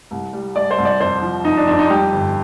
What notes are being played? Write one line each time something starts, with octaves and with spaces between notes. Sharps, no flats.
C2
G3
G3 D5
C5
C2
D5
F2 C5
F3
F2 D#4
D4
F2 D4
D#4
G3 G4
G1